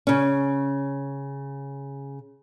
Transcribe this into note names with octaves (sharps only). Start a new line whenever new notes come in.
C#3 C#4